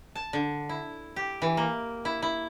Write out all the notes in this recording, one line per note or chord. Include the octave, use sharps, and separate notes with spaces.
A5
D3
E4
G4
E3
A#3
E4
E4